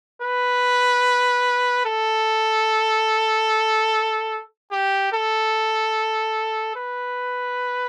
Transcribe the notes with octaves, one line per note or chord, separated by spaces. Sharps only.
B4
A4
G4
A4
B4